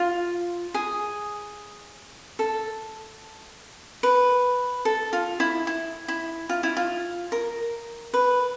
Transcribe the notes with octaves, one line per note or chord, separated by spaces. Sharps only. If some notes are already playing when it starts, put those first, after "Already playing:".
Already playing: F4
G#4
A4
B4
A4
F4
E4
E4
E4
F4
E4
F4
A#4
B4